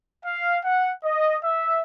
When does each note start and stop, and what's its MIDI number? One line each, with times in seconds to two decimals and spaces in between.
0.24 0.57 77
0.65 0.91 78
1.04 1.37 75
1.44 1.82 76